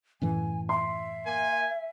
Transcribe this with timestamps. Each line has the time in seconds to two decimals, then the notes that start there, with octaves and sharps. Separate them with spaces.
0.22 F#2 A2 E3 G#5
0.69 E5 C6
1.26 A#3 G#5